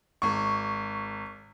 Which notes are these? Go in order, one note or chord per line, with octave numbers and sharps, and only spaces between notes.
G#1 C#6